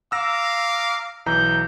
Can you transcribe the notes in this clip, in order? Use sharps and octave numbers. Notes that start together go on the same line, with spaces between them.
F5 A#5 D6 E6 A#6
B1 E3 A#5 G6